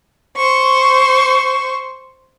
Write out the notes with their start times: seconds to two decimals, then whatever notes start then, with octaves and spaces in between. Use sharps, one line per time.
0.37 C5 C#6